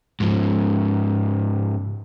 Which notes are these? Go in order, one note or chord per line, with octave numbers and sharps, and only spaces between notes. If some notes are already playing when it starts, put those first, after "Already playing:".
G#2 F3